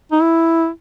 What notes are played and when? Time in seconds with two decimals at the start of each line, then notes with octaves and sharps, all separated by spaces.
0.12 D#4
0.22 E4